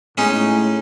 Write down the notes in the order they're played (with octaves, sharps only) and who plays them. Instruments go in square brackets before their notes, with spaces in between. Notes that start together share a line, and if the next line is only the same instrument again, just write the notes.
[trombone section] A2 [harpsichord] G#3 C#4 D#4